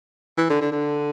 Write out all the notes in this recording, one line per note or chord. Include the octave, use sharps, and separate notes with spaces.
E3
D3
D3
D3